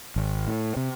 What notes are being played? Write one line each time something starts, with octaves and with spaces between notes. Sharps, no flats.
G#1
A2
C3